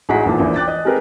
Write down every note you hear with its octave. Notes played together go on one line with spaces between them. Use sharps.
A1 G#3 F#4 F#5 A#5 B6
D#1 E2 A#2 A5
A#1 E2 A#2 E3
G5 D6 F#6 A6
D#5
G#3 C4 G4 A#4 B4